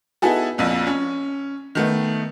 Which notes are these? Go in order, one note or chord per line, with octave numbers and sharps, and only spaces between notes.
B3 D#4 E4 F#4 G#4 A4
A#1 F2 A#2
C#4
D#3 A3 B3